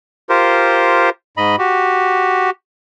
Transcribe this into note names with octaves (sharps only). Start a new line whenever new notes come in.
F4 G4 A#4 C5
G#2 D#5 B5
F#4 G4